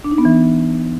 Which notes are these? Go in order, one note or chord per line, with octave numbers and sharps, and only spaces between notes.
D4
D#4
B3
E3